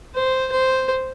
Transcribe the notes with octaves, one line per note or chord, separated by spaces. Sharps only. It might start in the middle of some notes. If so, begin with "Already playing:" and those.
C5
C5